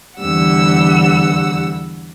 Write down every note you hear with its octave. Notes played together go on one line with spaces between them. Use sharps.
E2 D3 G3 F#5 E6